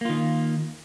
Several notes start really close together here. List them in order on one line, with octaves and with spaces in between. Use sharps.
A#3 F4 D#3